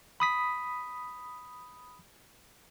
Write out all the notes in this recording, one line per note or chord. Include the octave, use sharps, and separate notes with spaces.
B5 D#6 B6